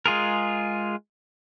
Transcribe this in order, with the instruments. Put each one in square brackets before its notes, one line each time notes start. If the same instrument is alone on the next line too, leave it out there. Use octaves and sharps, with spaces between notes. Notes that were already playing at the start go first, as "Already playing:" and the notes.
[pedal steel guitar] G#3 F4 G#4 A#4